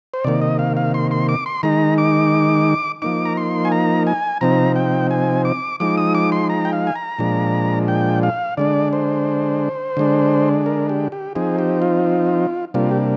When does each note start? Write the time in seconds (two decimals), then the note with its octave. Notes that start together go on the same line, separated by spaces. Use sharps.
0.14 C5
0.24 C3 D#3 A#3 D5
0.42 D#5
0.59 F5
0.77 F5
0.94 C6
1.11 C6
1.29 D6
1.46 C6
1.63 D#3 G#3 D#4 A#5
1.98 D6
3.02 F3 A#3 D#4 D6
3.25 A#5
3.37 C6
3.65 G#5
3.72 A#5
4.07 G#5
4.41 C3 F3 C4 D#4 A#5
4.76 G5
5.11 G#5
5.45 D6
5.80 F3 G#3 D#4 D6
5.97 D#6
6.15 D6
6.32 C6
6.50 A#5
6.65 G5
6.73 F5
6.87 G#5
6.96 A#5
7.19 A#2 F3 G#3 D4
7.88 G5
8.23 F5
8.57 D3 G#3 D4 D5
8.93 C5
9.97 D3 G#3 D4
10.66 A#4
10.89 G4
11.12 G4
11.35 F3 C4 D#4 G#4
11.59 G4
11.82 F4
12.74 C3 G3 A#3 D4 F4
12.91 G4